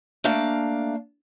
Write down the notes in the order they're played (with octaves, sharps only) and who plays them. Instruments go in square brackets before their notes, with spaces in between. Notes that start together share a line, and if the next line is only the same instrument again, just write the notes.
[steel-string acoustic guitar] A3 A#3 D4 F5